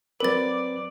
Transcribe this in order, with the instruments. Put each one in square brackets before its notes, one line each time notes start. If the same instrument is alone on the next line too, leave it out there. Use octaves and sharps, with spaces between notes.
[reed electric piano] F#3 C4 B4 [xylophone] A#4 A6 [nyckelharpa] D5